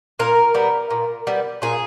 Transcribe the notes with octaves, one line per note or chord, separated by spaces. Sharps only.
A#2 A#4
G3 B3
A#2
G3 B3
A#2 G#4